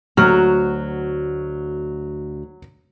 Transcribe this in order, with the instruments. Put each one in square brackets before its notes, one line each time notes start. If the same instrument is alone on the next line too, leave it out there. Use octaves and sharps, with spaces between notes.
[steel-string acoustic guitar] D2 F#4 A#5 [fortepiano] F#3 F6